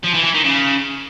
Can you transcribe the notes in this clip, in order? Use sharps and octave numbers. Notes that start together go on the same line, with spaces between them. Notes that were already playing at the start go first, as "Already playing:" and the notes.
F3
E3
E3
D#3
C#3